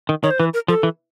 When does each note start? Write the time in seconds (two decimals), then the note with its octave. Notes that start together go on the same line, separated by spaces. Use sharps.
0.09 D#3
0.23 D#3 C#5
0.31 C5
0.39 E3 B4
0.54 A#4
0.68 F3 A4
0.83 E3